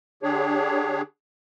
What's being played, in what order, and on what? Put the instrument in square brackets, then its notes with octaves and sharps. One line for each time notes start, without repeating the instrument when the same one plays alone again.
[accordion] D3 D4 G4 G#4 C#5